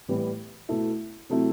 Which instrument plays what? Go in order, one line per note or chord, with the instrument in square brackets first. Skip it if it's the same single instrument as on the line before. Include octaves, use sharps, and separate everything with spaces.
[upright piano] A2 E3 G3 B3
B2 A3 E4
C3 F#3 A3 C4 E4